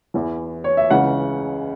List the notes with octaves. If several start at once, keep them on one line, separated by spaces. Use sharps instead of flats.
E2 E3
C#5
E5
C#2 C#3 E3 F#5